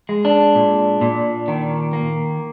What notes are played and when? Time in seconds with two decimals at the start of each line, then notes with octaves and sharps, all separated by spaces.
0.09 G#3
0.25 D4
0.55 A#2
1.01 A#2
1.48 D#3
1.93 A#3